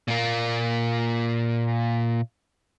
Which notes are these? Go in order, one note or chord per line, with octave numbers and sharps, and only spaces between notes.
A#2 A#3